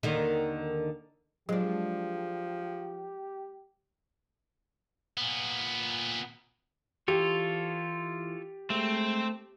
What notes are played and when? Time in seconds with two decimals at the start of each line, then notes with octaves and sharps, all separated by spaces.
0.03 D#2 D3 D#3
1.49 F3 F#3 G#3 D4 G4
5.17 A#2 B3
7.08 E3 F4 G4 A4 C#5
8.70 G#3 A3 C4